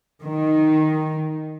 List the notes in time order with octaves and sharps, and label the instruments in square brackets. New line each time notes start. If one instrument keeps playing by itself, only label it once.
[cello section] D#3